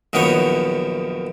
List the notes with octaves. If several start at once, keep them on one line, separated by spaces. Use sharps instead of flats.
A#1 F#2 D#3 B3 C#5 F#5